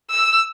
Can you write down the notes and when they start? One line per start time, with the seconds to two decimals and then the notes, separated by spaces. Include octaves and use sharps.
0.11 E6